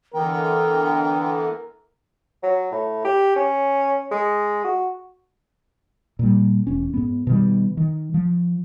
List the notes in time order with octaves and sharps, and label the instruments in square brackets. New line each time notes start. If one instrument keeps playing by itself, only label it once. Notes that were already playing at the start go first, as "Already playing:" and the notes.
[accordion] D3 E3 B3 [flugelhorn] A#4 [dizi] G5
[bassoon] F#3
A2
G4
C#4
G#3
F#4
[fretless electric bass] A#2 G3
E1 C#4
G#2 B3
B2 D#3 G3
D#3
F3